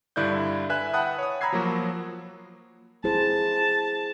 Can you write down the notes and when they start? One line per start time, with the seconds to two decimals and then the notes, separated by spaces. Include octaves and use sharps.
0.16 G2 D3 E4 D5 F#6 G6
0.69 B4 E5 G#5 F#6
0.93 F#5 G5 A5 B5 D#6 F#6
1.18 C#5 D#6
1.41 A#5 B5 E6 G#6 C7
1.53 F3 F#3 A#3 F#4
3.04 E4 G#4 C5 A5